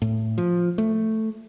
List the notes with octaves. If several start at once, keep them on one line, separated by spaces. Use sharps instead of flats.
A2
F3
A3